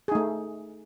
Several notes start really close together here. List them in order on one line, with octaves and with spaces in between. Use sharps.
G#4 D#4 A3